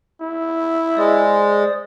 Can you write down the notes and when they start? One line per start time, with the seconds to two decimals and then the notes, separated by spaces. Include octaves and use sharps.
0.21 E4
0.97 G#3 C5 D5 D#6